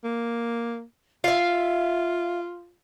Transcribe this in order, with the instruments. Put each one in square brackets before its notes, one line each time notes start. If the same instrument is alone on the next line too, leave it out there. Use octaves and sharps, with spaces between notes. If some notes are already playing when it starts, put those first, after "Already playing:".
[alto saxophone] A#3
[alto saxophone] F4 [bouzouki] E5 F5